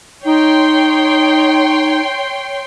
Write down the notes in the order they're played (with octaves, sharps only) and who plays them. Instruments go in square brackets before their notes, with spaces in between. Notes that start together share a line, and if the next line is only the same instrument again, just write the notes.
[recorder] D#4 [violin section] C#5 G5 C6